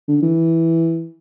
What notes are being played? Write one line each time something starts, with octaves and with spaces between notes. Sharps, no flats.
D3
E3